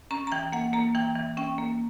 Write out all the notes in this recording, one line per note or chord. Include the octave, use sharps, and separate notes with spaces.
C#4 A#5
A#5
E3 G5
A#3 F#5
A#3 A#5
E3 G5
E3
C#4 G5
A#3